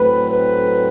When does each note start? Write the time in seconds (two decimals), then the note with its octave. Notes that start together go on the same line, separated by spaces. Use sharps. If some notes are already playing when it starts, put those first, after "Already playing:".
Already playing: A2 F#3 A3 C4 B4
0.31 B4